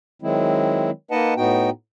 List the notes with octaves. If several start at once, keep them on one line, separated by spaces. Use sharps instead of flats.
D#3 F#3 G#3 C4 E4
A#3 D#4 B4 D#5 F#5 A5
A2 B3 D#4 F#4 G5